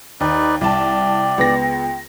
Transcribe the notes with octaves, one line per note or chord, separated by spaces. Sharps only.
D#2 D#4 B4 D5
C2 D5 G5 A5
C#2 B3 A#6